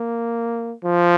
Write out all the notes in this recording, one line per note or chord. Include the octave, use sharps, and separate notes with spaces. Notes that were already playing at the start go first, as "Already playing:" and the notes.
Already playing: A#3
F3